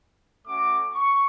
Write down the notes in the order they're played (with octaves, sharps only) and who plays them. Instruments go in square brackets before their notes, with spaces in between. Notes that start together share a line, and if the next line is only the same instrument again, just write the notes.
[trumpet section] A3 C#4 F#4 D6
C#6